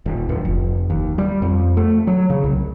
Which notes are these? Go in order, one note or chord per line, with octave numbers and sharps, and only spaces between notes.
D#1
D1
F1
D#2
G3
F2
A3
F#3
C#3
C2